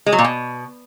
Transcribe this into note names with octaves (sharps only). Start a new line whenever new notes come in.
G#3
F#3
A#2
B2